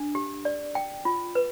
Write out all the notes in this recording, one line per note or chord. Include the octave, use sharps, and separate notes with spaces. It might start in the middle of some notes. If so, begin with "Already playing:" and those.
Already playing: D4
G4
D5
G5
F4
B4